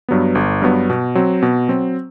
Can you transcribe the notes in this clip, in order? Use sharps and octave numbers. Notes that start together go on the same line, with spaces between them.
G2 F#3 B3
G1
G2 F#3 B3
B2
F#3 C4
B2
F#3 C4